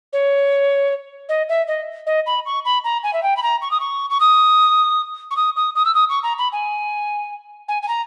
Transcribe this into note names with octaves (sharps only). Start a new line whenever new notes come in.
C#5
D#5
E5
D#5
D#5
B5
C#6
B5
A#5
G#5
E5
G5
B5
A#5
C#6
D#6
C#6
C#6
D#6
C#6
D#6
D#6
D#6
E6
D#6
C#6
A#5
B5
G#5
G#5
G#5
A#5